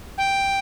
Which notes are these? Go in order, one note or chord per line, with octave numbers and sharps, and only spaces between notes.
G5